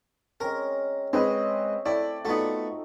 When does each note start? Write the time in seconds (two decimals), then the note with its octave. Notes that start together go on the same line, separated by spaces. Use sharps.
0.40 G#3 C4 C#4 A#4
1.13 G#3 C4 C#4 B4 D#5
1.86 A3 C4 E4 D5
2.25 A3 B3 D#4 F4 F#4